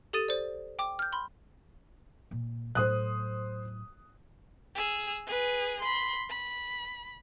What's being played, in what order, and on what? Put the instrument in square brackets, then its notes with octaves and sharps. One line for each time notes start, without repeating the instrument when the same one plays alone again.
[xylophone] G4 A4 D#6 A6 D#7 E7
C5 D5
G5 D6
F6 G6
B5 C6
[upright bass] A#2
[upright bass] A2 F#3 [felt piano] C5 D#6 F#6
[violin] G#4 E6
G#4 B4
B5 C6
B5